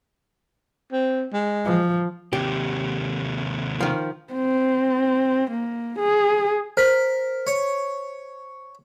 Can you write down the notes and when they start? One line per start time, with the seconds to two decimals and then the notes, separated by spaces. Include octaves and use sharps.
0.93 C4
1.34 G#3
1.65 F3
2.33 D#2 C3 G4
3.80 D#3 F3
4.33 C4
5.50 A#3
5.99 G#4
6.77 A#4 C5 B6
7.47 C#5